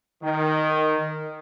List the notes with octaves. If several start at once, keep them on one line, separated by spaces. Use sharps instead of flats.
D#3